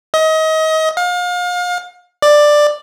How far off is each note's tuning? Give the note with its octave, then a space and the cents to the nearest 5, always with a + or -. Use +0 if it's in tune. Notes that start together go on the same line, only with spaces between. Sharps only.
D#5 +30
F5 +35
D5 +10